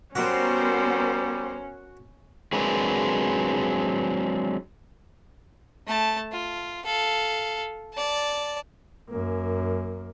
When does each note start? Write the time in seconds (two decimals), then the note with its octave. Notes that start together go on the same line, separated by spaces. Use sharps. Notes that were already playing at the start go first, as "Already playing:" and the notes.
0.15 G3 B3 C#4 F#4 A#4 C5
2.52 F#3 G#3 C4 D4 A#4 B4
5.87 A3 A5
6.32 F4
6.85 A4 F5
7.94 D5 A5
9.10 F#2 A#3